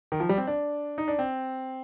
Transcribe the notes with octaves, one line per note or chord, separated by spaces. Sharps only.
D#3
F3
G3
C4
D4
D#4
D4
C4